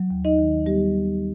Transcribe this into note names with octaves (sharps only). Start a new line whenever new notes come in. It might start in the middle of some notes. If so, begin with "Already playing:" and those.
Already playing: F#3
D#2
D#4 D#5
D#3
G3 B3 G4